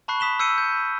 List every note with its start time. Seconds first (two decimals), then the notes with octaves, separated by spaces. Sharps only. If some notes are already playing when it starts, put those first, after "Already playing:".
0.08 A5 B5 C#6 F#6 C7
0.20 D#6 B6 E7 G7
0.39 E6 G6 C7 C#7 D#7
0.58 G6